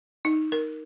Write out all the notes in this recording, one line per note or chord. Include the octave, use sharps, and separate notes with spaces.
D#4
A#4